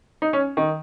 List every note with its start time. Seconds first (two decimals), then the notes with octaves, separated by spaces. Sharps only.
0.22 D#4
0.33 C#4
0.57 D#3